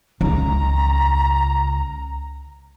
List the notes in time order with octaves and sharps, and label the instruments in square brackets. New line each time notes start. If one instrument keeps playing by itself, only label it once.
[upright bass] C#2 [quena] A#5